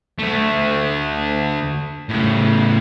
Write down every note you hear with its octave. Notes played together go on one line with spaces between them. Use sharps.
D2 A3
A2 C#3